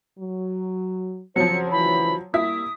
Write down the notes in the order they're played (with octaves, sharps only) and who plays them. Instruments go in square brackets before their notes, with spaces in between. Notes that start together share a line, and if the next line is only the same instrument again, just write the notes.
[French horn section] F#3
[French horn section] F2 C#3 C5 [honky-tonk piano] F3 F#3 [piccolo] C#7
[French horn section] D2 C#3 E3 [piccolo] B5
[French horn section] G3 A#3 [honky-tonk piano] E4 B6 [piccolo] D#6